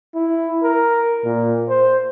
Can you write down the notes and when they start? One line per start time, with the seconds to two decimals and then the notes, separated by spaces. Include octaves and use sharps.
0.15 E4
0.63 A#4
1.25 A#2
1.69 C5